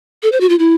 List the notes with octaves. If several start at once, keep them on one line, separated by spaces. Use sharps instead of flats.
A4
C5
F#4
F4
E4